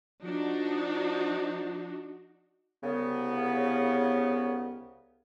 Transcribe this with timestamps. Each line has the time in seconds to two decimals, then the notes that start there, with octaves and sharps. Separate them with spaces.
0.24 F3 D4 D#4 F#4
2.83 C2 C#3 B3